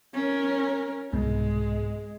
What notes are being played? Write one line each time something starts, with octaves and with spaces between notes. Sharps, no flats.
C#4 A#4
C2 G#2 B2 G#3